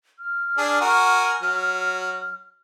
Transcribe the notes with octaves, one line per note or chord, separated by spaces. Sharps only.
F6
D4 G#4
F#4 A#4 G#5
F#3